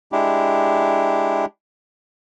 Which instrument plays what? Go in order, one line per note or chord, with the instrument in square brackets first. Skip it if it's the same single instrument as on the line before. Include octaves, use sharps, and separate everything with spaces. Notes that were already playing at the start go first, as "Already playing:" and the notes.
[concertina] G#3 D4 E4 G4